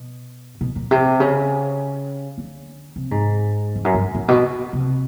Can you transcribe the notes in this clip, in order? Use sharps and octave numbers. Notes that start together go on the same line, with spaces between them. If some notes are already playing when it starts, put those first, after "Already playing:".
Already playing: B2
B2
A#2
C3
C#3
D3
C3
G#2
F2
F#2
G2
A2
B2
C3